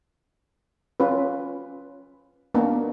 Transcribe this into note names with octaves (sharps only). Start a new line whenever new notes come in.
C#4 F4 B4
A#3 B3 D4